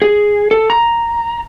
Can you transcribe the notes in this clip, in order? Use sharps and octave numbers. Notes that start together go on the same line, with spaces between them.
G#4
A4
A#5